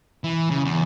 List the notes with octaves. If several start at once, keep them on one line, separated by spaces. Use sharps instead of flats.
E3
C#3
E2